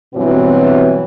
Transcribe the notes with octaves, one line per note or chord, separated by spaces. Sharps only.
G2 B2 E3 F#3 C4